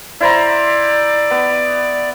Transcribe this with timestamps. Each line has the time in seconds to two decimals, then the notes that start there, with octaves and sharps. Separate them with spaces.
0.21 E4 C5 D5 A#5
1.31 B3